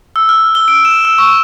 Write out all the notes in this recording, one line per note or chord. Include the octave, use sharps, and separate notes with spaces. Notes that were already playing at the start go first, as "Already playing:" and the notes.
E6
F6
G7
D7
E7
E6
C#6